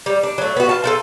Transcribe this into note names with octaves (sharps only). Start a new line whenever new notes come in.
G3
D4
F#3 A3
B3 F#4
F4 A5
F4 F#4 A4